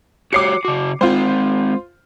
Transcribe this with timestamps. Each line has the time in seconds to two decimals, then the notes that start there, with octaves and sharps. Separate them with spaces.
0.33 F#4 G4 C#5 D6 C7 C#7
0.65 C#3 F#4
1.01 G#3 C4 F4 C5